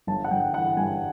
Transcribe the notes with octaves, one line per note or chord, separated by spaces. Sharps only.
G1 A5
F#5
G1 G5
E3 F#5
G2 G#5